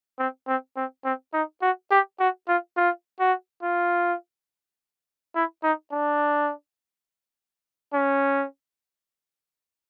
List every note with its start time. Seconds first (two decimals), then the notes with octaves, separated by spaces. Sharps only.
0.19 C4
0.48 C4
0.77 C4
1.05 C4
1.34 D#4
1.62 F#4
1.91 G4
2.20 F#4
2.48 F4
2.77 F4
3.20 F#4
3.63 F4
5.35 E4
5.63 D#4
5.92 D4
7.93 C#4